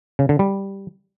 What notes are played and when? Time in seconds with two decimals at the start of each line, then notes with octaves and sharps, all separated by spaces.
0.19 C#3
0.29 D3
0.39 G3